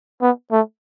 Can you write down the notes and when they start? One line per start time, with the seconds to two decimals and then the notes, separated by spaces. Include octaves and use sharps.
0.21 B3
0.52 A3